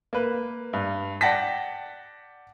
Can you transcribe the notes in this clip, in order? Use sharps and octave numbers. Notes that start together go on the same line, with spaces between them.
A#3 B4
G2
D5 F#5 G5 A5 A#6 B6